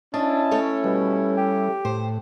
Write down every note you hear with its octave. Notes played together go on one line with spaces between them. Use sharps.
C#4 D4 E4 D#5 A5
A3 A4 C#5
B2 G3
G4
A2 C5